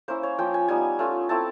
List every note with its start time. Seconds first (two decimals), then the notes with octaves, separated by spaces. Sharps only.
0.08 A#3 C#4 E4 C5
0.23 C#5
0.38 F3 A#3 C#4 G5
0.54 G#5
0.68 G3 B3 D#4 G#5
0.99 A3 C#4 F4
1.29 A3 C4 E4 A5